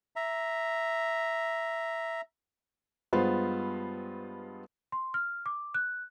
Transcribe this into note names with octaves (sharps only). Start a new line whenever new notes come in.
E5 A#5
G2 G#3 B3 F4 C5
C6
F6
D6
F#6